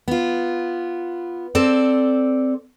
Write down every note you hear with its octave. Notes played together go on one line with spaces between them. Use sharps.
B3 F4
C4 A4 C5 D5